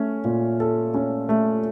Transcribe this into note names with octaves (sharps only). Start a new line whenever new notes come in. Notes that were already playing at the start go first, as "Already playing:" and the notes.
Already playing: A3 C#4
A#2
A4
C#4
A3